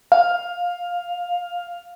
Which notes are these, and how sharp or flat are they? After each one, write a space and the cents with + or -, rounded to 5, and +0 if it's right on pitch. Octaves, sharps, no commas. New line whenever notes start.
F5 +10